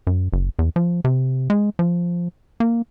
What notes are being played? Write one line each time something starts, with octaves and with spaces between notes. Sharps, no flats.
F#2
F#1
E2
F3
C3
G#3
F3
A#3